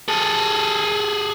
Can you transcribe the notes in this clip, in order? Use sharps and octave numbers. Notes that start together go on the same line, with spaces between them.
G#4 A4